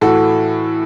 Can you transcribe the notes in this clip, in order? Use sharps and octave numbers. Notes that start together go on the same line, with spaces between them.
A2 E3 F#4 A4